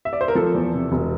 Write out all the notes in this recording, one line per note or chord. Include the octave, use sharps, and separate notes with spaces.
E5
D5
C5
A#4
F3 A4
E2
C3
E1